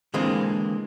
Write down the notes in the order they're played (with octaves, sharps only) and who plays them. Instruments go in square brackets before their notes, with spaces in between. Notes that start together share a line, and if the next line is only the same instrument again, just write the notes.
[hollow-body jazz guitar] D3 E3 G#3 A#3 C4